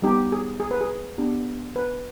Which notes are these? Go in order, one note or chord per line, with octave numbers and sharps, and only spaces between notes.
G3 B3 D#4 G4
G#4
G#4
B4
G#4
B3 D4 G4
B4